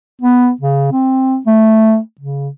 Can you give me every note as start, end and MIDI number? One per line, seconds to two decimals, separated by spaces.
0.22 0.51 59
0.61 0.90 49
0.92 1.37 60
1.47 1.98 57
2.21 2.49 49